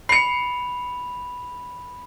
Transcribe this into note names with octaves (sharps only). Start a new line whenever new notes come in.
B5 C7 C#7 F7